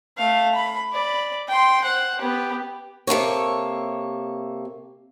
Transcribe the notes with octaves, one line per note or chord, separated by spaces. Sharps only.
A3 F5
B5
D5 B5
G5 C6
C5 F#5
B3 G4
C3 A#3 A4 C#5